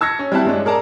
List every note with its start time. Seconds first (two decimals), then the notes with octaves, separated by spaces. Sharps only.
0.01 A5 E6 G#6 A#6 C#7
0.19 C#4
0.32 G3 C4 E4 E5 A5 F#6
0.45 G2 G#3 C#4 D4
0.65 G#4 A#4 D5 A5 A#5